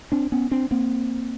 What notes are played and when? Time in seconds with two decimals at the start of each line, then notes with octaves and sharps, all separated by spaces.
0.12 C4 D4
0.32 B3 C#4
0.51 C4 D4
0.71 A#3 C4